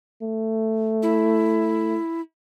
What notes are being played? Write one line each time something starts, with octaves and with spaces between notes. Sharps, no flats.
A3
E4